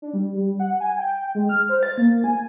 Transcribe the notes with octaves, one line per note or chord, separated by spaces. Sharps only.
D4
G3
G3
F#5
G#5
G5
G#3
F6
C5
A6
A#3
G#5